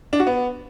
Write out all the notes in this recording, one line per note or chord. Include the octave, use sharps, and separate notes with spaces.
D4
F#4
B3